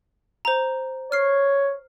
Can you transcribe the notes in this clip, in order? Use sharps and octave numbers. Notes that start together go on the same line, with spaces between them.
C5 A#5
C#5 F6 C7